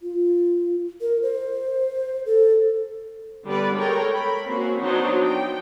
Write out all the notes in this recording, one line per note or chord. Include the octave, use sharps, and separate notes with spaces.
F4
A#4
C5
A4
D3 G3 B3 B4 D5
G#3 A4 A#4 C#5 G5
B5
A#3 C4 C#4 F#4
F#3 B3 D4 D#4 C5
G5